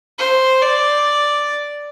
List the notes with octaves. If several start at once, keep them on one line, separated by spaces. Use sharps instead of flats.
C5
D5